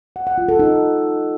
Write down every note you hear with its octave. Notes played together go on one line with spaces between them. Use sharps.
F#5
F#5
F4
A4
D#4